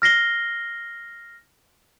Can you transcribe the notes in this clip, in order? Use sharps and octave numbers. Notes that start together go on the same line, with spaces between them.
F6 A#6 C7 G7